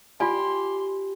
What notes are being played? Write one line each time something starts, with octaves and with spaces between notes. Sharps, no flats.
F4 G4 D5 G#5 C6